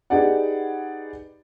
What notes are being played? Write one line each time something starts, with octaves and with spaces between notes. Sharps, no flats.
D#4 G4 G#4 B4 D5 F#5